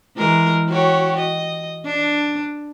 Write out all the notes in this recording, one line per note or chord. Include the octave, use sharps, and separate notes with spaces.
E3 G#3 A#4
F#4 G4 C#5
D#5
D4